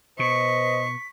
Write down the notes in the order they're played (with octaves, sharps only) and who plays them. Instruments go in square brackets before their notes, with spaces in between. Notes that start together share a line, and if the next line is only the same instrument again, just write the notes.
[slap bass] B2 [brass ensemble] B4 C5 D#5 [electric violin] C#6 [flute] B6